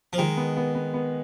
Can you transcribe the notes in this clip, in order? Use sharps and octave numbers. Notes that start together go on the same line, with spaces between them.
F3
D#3 G#3
B3
B3
B3
B3